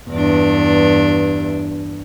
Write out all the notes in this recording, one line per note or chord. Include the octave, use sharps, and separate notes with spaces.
E2 G2 D4